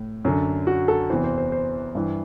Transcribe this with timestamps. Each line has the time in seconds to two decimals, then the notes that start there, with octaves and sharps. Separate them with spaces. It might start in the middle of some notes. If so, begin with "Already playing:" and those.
Already playing: A2
0.25 F#2 D3
0.67 F#4
0.88 A4
1.10 E2 C3 E3 C5
1.24 C5
1.38 C5
1.52 C5
1.95 G2 E3